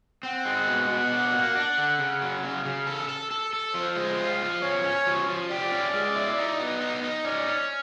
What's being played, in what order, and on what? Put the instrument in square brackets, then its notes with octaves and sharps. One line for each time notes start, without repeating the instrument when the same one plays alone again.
[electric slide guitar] C4 [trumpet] F#5
[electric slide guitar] G#3
B2
B2
D4
A#3
D4
D3
C#3
F#3
C#3
C#3
A4
A4
A4
A4
[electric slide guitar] F3 [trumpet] C5
[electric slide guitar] G#3
F4
F3
[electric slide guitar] C#4 [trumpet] C#5
[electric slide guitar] C#4
F3
F3
[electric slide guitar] G4 [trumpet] D5
[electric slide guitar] C#4
G#3
E4
D#4
B3
D#4
D#4
[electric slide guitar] C#4 [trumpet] D5
[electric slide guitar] C#4